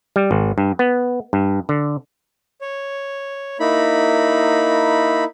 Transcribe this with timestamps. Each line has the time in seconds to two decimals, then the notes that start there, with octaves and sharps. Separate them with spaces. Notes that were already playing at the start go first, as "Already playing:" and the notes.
0.16 G3
0.31 G#1
0.58 G2
0.79 B3
1.33 G2
1.69 D3
2.61 C#5
3.60 A#3 D#4 E4 B5